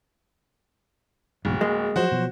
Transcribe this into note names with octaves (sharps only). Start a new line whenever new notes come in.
D1 B1 E2 G#2
G#3 A#3
F3 F#3 F#4 C5
B2 F3 F#3